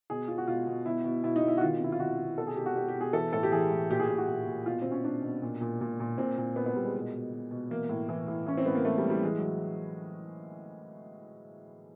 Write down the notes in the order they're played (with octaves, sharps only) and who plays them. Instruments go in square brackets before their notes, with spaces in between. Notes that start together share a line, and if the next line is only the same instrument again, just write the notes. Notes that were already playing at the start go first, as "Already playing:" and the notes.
[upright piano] B2 G#4
B2 F4
F#4
B2 F4
B2
B2 E4
B2
B2 E4
D#4
B2
E4
F#4
D#3 F4
C3 E4
F4
D#3 F#4
C3
B2 A4
G#4
B2 G4
F#4
B2 G4
G4
B2
G#4
E3 A4
A2 A4
G4
E3 G#4
A2
A#2 G4
G#4
A#2 G4
F#4
A#2
A#2
B2 F4
B2 C4
C#4
B2 D4
B2
A#2
A#2
A#2
A#2
A#2 C4
A#2
A#2 B3
B3
A#2 G3
G#3
B2
B2
B2
B2
E3 A#3
A2
E3
A2
E3 C#4
C4
A2 B3
A#3
E3 A3
G3
A2
G3
E3 G#3
F#3